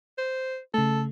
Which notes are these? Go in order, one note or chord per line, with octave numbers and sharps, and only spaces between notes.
C5
C#3 A3 A4